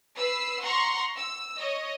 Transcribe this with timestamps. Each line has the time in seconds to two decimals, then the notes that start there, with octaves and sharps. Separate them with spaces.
0.16 B4 E6 C7
0.61 F#5 A#5 C6 C#6
1.17 E6
1.57 C#5 D#5